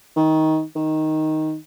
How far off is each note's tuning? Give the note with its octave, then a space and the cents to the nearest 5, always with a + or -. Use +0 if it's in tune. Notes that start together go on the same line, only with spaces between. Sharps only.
D#3 +20
D#3 +5